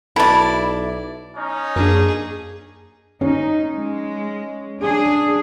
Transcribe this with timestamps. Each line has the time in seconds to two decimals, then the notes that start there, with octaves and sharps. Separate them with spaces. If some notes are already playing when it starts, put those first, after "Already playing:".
0.16 B1 E4 A4 B4 D5 E5 B5
1.36 C#4 D#4
1.76 F#2 A#3 D4 G#4
3.21 C#4 D#4
3.73 G#3
4.81 D4 G#4